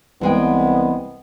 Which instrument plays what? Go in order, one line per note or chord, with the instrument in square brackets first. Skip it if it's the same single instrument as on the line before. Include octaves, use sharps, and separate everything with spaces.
[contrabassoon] C2 [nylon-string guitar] E3 G#3 G5 [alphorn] B3